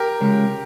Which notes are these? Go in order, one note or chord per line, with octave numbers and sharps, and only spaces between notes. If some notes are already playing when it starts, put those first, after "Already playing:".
Already playing: G4 A#4
C#3 G#3 C#4